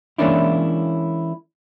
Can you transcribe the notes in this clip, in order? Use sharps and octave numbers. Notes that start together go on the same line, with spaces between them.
E3 G#3 A#3 C#4 D4 E4